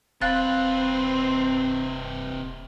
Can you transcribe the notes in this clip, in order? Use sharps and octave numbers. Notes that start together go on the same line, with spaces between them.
D#1 C3 C4 B4 F5 F#6 A6